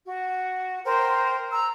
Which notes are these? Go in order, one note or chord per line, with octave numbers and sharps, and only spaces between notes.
F#4
A#4 C5 G5
A#5 E6